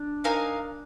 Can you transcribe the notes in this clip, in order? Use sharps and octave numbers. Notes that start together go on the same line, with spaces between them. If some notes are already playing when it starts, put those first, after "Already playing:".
Already playing: D4
D#4 A#4 F5 G#5